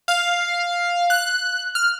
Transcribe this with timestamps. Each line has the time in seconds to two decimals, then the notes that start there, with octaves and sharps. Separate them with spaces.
0.08 F5
1.10 F#6
1.75 F6